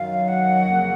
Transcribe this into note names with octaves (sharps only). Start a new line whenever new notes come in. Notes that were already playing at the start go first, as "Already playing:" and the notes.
Already playing: F#2 D#3 F#3 F5
F#5
F2 C#3 F#3 A#3 C#4